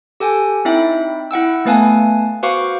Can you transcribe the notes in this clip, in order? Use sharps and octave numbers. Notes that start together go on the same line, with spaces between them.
G4 A4 G5 G#5
C4 D#4 E4 E5 G5
E4 F#5 G5 E6
A3 B3 B4 F5 G#5 A5
F#4 B4 C5 F5 C#6 D6